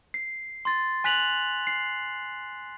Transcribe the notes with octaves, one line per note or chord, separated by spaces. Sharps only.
C7
C6 A6
G#5 F#6 B6 F7 F#7
C7